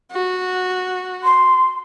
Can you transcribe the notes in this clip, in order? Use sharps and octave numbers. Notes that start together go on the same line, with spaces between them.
F#4
C6